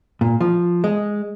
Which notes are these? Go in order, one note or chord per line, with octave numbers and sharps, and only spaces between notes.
A#2
F3
G#3